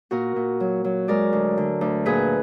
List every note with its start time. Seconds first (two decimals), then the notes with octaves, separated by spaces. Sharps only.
0.11 A#2 F#4 A#4
0.36 A#2
0.60 F#3
0.84 F#3
1.08 G#3 A#4 D5
1.33 D2
1.58 D3
1.81 D2
2.06 A#2 G#4 B4